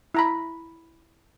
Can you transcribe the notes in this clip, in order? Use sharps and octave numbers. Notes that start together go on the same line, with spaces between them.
E4 A#5 B5